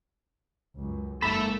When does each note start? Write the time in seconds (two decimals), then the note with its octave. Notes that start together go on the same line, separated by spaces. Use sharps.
0.76 C#2 F#2
1.22 F#1 G#2 A#3 A4 E5 B5